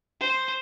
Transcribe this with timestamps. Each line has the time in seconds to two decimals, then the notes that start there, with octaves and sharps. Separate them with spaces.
0.20 C5